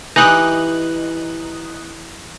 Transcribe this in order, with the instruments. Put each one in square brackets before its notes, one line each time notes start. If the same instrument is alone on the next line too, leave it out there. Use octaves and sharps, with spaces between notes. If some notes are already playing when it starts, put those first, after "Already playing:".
[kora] E3 G4 [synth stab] D#4 F#6